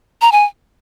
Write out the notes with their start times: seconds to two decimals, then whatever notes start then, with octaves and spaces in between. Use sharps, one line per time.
0.21 A#5
0.32 G#5